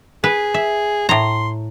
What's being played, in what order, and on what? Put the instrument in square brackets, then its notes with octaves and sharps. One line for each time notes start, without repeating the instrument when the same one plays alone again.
[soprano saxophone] G#4 [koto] B4
[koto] E5
[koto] A2 A#5 [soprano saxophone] C6